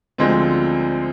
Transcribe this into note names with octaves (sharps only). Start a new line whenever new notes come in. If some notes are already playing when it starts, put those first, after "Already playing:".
D2 D3 F3 G#3 C4